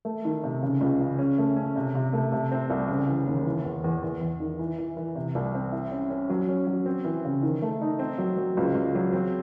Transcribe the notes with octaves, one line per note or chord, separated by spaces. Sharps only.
A3
D#3
C3
C#3
C#2
C#3
C#4
A3
C#4
C3
C3
A3
C3
C4
C2
C#3
E3
D#2
E3
E2
E2
E2
E2
D#3
E3
E3
E3
C3
C2
C4
E4
C#4
C#4
F#3
C#4
F#3
C4
E3
C#3
D#3
A3
D#4
C4
F#3
F#3
C#2
C#2
F#3
C4